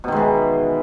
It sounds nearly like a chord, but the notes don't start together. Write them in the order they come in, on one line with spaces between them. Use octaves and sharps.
B2 D#3 G#3 E3